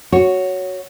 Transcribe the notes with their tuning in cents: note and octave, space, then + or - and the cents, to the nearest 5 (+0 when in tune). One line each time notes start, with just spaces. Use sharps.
F#4 +0 C#5 +0